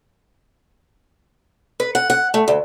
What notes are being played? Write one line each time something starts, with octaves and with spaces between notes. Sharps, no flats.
B4
F#5
F#5
A3
D2